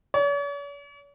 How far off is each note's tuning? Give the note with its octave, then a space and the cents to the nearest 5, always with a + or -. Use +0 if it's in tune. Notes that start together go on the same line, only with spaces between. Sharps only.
C#5 +45